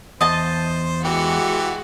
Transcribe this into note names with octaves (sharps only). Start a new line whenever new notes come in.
E2 C5 D#5 A5
E3 G#3 F#4 G4